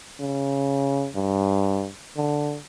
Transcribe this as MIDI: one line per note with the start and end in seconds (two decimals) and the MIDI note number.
0.21 1.09 49
1.15 1.88 43
2.16 2.57 50